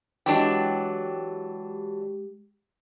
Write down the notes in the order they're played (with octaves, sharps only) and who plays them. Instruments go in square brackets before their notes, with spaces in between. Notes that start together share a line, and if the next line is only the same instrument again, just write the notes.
[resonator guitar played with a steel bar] E3 F#3 D4 [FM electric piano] G#3 G4